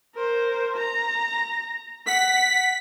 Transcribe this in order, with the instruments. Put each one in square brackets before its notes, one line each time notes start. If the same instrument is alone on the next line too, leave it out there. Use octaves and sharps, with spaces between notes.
[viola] A#4 C5
A#5
[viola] F#5 [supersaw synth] B6